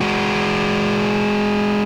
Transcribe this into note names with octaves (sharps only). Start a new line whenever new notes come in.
G#3 F#4